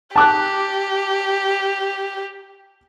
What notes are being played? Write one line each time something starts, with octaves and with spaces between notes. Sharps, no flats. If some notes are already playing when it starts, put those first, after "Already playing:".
G4 A5 D6 F#6